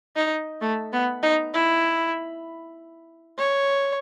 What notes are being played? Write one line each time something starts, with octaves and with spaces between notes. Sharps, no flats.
D#4
A3
B3
D#4
E4
C#5